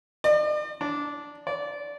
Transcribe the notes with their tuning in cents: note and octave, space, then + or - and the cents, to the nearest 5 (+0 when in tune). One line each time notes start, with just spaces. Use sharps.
D5 +45
D4 -10
D5 -20